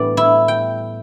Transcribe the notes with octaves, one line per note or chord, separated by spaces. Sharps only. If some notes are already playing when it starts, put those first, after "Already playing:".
Already playing: A2 E3 G3 B3 D4 D5
E4
G5